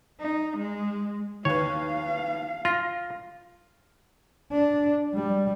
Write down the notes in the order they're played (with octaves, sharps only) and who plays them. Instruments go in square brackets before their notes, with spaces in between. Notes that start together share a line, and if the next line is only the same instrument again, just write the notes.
[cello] D#4
G#3
[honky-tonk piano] D#2 B4 [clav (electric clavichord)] C#5 [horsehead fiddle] F5
[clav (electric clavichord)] F4 [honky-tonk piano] A#6
[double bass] D4
G3